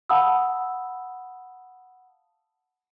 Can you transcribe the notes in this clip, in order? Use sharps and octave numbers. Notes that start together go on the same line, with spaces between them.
F5 F#5 A5 B5 D#6 E6